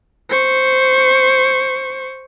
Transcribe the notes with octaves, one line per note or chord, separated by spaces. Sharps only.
C5 C#6